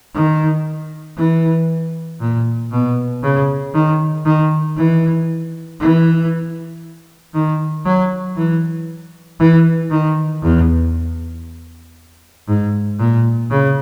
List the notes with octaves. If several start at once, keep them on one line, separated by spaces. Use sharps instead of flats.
D#3
E3
A#2
B2
C#3
D#3
D#3
E3
E3
D#3
F#3
E3
E3
D#3
E2
G#2
A#2
C#3